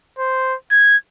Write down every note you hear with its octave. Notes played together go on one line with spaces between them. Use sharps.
C5
G#6